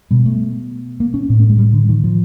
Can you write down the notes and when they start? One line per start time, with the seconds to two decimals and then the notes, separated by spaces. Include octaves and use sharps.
0.11 B2 G3
0.26 A3
1.00 A#3
1.14 C#4
1.29 A2 C4
1.39 A3
1.50 G#3
1.58 G3
1.73 D3
1.89 D#3
2.04 F3